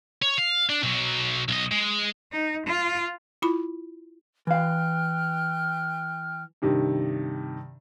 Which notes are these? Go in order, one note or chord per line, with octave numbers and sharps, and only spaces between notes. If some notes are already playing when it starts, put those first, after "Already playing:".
C#5
F5
D4
B2 F#3
B1 D#5
G#3
D#4
F4
E4 F4 B5
E3 F5 G5 F6 F#6
G2 C3 D#3